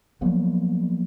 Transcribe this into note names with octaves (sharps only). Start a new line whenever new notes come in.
F3 F#3 A#3 B3